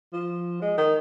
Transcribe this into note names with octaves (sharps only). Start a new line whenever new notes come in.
F3
G#3
D#3